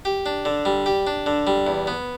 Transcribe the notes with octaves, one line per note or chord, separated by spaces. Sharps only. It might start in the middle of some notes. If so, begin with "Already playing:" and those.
G4
D4
D3
G3
G4
D4
D3
G3
E2
B3